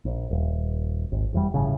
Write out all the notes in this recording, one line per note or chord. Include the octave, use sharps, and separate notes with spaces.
A#1
D#1
G#1
F1 E2 G3
G1 A2 C#3